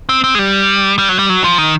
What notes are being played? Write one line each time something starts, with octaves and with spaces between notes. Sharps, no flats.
C4
C4
G#3
G3
G3
F#3
G3
F#3
F3
D#3